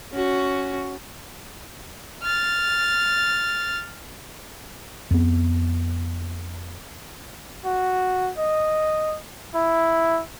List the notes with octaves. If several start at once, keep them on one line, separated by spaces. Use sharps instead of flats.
C#4 F#4
F6 A6
F2 B3
F#4
D#5
E4